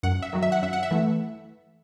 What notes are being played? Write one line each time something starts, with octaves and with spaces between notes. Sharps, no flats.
F#2 F#5
E5
D#3 F#3
E5
F#5
F#2 E5
F#5
E5
E3 A3